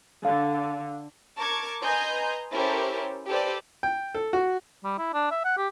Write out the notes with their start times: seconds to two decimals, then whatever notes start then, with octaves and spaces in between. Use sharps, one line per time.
0.25 D3 F5
1.37 A#4 A5 C#6 D6 G#6
1.83 B4 D#5 G#5 A#5 C6 G6
2.52 C#4 E4 G4 A4 A#4 C5
3.28 G4 A4 B4 C5 D5
3.83 G5
4.15 A4
4.33 F#4
4.84 G3
4.98 E4
5.13 D4
5.31 E5
5.45 F#5
5.57 G4